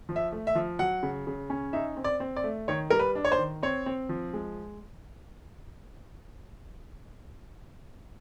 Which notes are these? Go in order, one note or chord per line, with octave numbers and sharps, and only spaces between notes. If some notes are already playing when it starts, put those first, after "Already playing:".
F3
E5
A3
E5
F3
F#3 F#5
C#3
C#3
C#4
D#4 E5
C4
D5
C4
D5
A3
D#3 C#5
G3 A#4
B4
D4
C#5
C5
D#3
C4 C#5
C4
F3
G#3